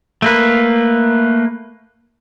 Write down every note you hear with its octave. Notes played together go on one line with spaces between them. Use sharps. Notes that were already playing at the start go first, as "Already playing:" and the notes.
A3 A#3 B4